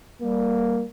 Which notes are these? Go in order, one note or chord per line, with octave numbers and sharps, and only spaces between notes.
G3 A#3